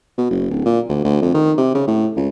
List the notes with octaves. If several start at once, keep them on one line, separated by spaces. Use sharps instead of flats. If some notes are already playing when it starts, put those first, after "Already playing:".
B2
F#1
D1
A#2
D2
D2
F2
D#3
C3
C#3
A2
C#2